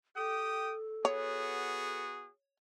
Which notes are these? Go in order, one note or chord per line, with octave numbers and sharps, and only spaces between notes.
G4 A4 G5 D#6
B3 F#4 G#4 C#5